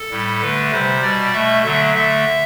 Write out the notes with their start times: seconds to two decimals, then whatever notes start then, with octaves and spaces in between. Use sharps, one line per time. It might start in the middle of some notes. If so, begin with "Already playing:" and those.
Already playing: A4
0.11 A2 G3
0.40 D3 A3 B4
0.71 C3 G3 C5
1.01 B2 G3 D5
1.32 B2 A3 E5
1.63 D3 F#3 A3 E5
1.94 D3 A3 E5